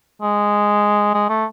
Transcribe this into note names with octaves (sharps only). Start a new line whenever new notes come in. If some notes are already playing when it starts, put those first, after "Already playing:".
G#3
G#3
A3